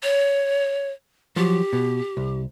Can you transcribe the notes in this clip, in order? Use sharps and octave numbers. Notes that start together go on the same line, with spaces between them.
C#5
F3 F#3 G4
B2
C2